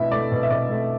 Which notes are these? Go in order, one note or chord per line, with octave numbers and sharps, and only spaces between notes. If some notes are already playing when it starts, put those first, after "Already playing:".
Already playing: B2 A3 E4 E5
A3 D5
B2
E5
B2 D5
A3